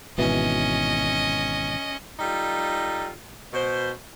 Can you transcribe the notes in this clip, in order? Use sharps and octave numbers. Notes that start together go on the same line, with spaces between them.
G#1 B2 E3 C#4 D#5
G3 D#4 F4 A4
B2 C5